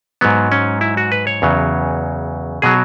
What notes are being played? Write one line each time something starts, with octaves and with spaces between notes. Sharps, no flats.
G#2 F#3 B3
C#4
E4
F#4
B4
C#5
E2 C#3 F#3
B2 F#3 G#4